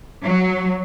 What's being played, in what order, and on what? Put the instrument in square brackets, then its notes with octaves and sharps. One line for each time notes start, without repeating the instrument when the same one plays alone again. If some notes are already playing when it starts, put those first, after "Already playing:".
[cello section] F#3